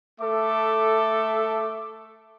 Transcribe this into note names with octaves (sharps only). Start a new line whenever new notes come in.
A3 A4 E5 D6